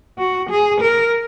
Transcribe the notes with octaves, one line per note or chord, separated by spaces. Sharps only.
F#4
G#4
A#4